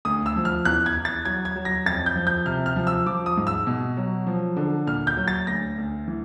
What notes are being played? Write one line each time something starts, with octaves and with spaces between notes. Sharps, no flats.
D2 D#6
E6
F3
F6
E2 F#6
G#6
E2
A6
F#3 G#6
G#6
F#3
A#6
F2 A6
G6
F3
G6
C3 F6
F6
F3
E6
F3 D6
D#6
G#2
E6
B2
F#3
F3
D3
A#2 F6
G6
F#3
A6
D2 A#6
D2
E3